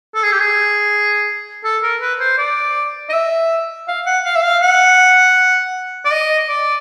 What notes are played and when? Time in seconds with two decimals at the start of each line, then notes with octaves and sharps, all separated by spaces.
0.15 A4
0.23 G#4
0.32 G4
0.40 G#4
1.64 A4
1.83 A#4
2.01 B4
2.20 C5
2.38 D5
3.09 D#5
3.13 E5
3.88 F5
4.06 F#5
4.25 F5
4.36 E5
4.44 F5
4.62 F#5
6.05 D5
6.12 D#5
6.49 D5